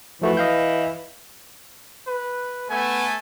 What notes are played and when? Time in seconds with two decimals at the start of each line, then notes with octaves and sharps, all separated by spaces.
0.22 E3 F3 A3 F#4
0.37 D#5 F5 G6
2.07 B4
2.70 A3 B3 G#5